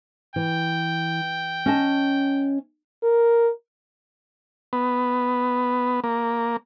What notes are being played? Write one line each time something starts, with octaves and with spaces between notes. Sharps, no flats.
E3 G5
C#4 D#5 A5
A#4
B3
A#3